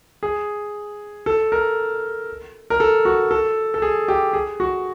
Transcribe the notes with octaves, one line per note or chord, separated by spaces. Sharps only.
G#4
A4
A#4
A#4
A4
F#4
A4
A4
G#4
G4
G#4
F#4